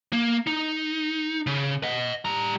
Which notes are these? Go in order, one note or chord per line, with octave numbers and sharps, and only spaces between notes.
A#3
D#4
C#3
D#5 F#5
G3 A#5